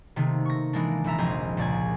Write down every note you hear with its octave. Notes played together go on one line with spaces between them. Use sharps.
C3 D#3 A3 A#3
C#6 A#6
E3 G#3 A#3 D4
A#1 E3 E5 A#5
F1 A#1 C4 G#4 D#5
C#2 A#2 D5 G#5 G#6